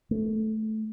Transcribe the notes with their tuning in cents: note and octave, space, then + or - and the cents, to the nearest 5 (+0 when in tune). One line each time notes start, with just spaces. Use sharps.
A3 -10